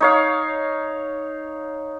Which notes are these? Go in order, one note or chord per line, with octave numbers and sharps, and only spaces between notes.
D#4 C#5 F5